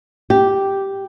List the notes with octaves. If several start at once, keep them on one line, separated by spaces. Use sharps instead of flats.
G4